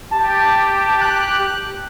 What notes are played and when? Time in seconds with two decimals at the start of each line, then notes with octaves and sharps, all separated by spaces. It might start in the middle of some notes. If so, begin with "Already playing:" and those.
0.11 G4 A5
1.01 F#6